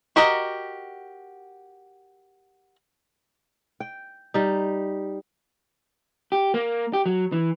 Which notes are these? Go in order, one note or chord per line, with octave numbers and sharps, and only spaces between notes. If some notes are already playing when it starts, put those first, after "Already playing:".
F#4 G4 A#4 D#5 F#5
G5
G3 D#4
G4
A#3
G4
F#3
E3